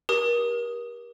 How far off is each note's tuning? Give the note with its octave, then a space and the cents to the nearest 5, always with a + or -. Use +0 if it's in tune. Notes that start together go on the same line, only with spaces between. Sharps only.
G4 +0 A#4 +35 D#6 +0